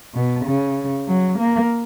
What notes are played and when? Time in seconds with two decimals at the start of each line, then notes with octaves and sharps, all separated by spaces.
0.15 B2
0.45 C#3
1.08 F#3
1.39 A#3